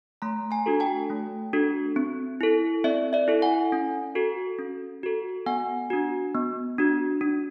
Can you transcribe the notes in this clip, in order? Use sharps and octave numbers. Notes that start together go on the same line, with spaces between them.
A3 A#5 C6
G#5 A#5
D4 F#4 A4
G5 A5
A3
D4 F#4 A4
C4
E4 A4
C4 D5 E5
D5 E5
E4 A4
F#5 G#5
C#4
F#4 A4
C#4
F#4 A4
B3 F#5 G#5
D4 F#4
B3
D4 F#4
D4